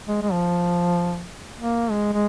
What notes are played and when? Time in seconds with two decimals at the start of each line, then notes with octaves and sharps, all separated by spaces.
0.08 G#3
0.22 G#3
0.32 F3
1.56 A#3
1.90 G#3
2.13 G#3